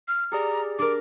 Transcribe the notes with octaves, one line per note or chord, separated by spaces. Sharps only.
F6
G4 G#4 D5 A#5
D4 A#4 D6